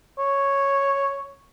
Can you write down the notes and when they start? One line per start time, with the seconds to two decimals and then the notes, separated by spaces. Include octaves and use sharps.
0.19 C#5